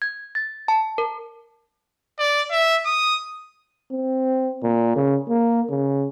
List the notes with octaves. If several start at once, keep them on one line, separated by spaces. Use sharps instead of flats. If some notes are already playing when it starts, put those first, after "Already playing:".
G#6
A6
A5
A#4
D5
E5
D#6
C4
A#2
C#3
A#3
C#3